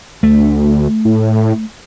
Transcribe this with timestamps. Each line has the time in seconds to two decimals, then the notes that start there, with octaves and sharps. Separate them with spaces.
0.23 D2 A3
1.05 A2